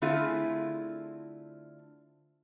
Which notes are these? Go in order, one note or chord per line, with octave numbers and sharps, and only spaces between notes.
D3 A3 C4 E4 F4 G#4